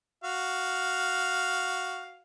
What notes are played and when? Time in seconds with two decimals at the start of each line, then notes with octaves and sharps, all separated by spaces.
0.24 F#4 F5